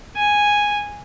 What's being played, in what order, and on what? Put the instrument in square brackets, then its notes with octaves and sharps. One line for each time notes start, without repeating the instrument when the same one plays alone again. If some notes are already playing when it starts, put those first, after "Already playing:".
[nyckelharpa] G#5